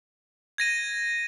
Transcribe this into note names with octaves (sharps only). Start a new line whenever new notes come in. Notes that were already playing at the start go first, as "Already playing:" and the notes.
G#6 A#6 D#7